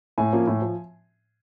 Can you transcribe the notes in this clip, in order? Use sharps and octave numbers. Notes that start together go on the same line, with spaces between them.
A2 G#5
F3 A#3 C#4
A2
F3